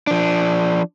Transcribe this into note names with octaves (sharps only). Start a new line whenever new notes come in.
F3 D4